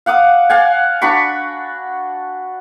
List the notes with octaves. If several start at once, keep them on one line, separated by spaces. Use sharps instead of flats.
F5 F#5 D6 D#6
D5 F5 F#5 G#5
D4 F#4 B5 C#6